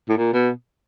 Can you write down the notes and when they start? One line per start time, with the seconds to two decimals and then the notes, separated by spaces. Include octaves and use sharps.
0.09 A2
0.17 A#2
0.34 B2